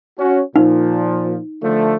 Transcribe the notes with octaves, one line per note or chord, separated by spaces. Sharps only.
C#4 F#4
A#2 F3 D#4
D3 F3 A3